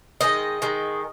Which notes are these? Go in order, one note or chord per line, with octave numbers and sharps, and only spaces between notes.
D#3 G#3 D#5
D#3 G#3